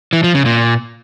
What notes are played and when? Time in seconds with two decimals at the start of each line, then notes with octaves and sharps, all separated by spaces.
0.13 E3
0.24 F3
0.35 C#3
0.45 A#2